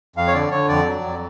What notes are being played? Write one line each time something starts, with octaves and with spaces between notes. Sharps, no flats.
F2 F5
C#5
D3 D5
D3 C#5
F2 D5
F#3
F2